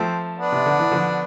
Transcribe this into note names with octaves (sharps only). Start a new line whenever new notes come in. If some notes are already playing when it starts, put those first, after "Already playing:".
Already playing: F3 A3 C4
B3 D4
C3
D3
E3
D3 F3